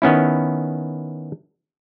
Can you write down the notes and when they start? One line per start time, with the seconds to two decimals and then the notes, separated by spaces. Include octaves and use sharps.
0.02 D#3 B3 C#4 E4